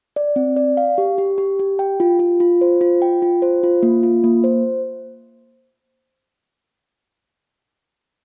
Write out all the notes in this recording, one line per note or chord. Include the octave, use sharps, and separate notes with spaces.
D5
C4
D5
F5
G4
G4
G4
G4
G5
F4
F4
F4
C5
F4
G5
F4
C5
F4
A#3
F4
A#3
C5